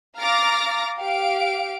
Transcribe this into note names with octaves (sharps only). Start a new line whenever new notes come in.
F5 A#5 D6 F6 A6 A#6
G4 F5 D7